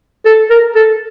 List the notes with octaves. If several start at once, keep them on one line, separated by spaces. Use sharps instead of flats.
A4
A#4
A4